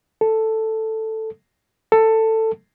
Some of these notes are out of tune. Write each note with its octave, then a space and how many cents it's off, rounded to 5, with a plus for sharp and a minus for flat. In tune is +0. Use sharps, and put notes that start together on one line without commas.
A4 +5
A4 +15